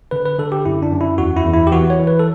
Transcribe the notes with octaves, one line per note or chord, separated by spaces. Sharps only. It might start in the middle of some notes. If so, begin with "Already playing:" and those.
D3 B4
B4
D3 A4
G4
F#2 E4
D4
F#2
E4
E2 F#4
E4
E2
E4
G4
E3 F#4
C#5
E3
B4
A4